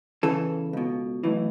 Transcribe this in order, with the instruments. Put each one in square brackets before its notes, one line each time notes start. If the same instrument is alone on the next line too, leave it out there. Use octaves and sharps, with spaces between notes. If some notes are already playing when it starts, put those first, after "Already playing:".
[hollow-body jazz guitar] E2 C#3 E3 A4
C#2 B2
B1 A2 E3